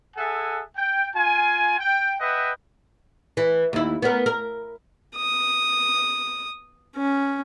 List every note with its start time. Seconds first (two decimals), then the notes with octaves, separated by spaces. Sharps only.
0.17 G#4 A4 E5 F#5 G#5
0.77 G5
1.15 F4 G#5
1.79 G5
2.20 B4 D#5 E5 F#5 G5
3.37 E3
3.73 D#2 E4
4.02 B3 C#4 A#4
4.26 A#4
5.16 D#6
6.96 C#4